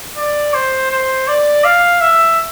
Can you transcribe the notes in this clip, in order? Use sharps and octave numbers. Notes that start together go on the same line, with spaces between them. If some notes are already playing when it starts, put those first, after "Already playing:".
D5
C5
C5
D5
F5
E5